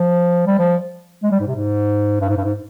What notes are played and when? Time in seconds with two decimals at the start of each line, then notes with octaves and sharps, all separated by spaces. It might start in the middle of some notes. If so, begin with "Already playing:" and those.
Already playing: F3
0.47 G3
0.58 F3
1.23 G#3
1.31 G3
1.40 G#2
1.47 C3
1.56 G#2
2.20 G2
2.29 G#2
2.37 G2
2.44 G#2